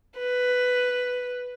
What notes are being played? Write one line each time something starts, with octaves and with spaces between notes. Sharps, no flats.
B4